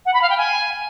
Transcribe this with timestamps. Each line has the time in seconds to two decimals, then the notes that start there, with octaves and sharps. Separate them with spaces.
0.05 F#5
0.13 B5
0.21 F5
0.29 G5
0.37 G#5